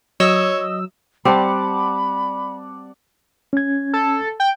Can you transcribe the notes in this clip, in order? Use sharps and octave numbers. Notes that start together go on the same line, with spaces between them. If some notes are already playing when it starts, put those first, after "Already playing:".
F#3 C#5 D#5 E6
G3 C4 D5 F#5 A5 B5
C#4 G#6
A4
G5